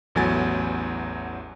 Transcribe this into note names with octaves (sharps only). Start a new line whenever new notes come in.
A1 E2 F#3 A3 G#5 A6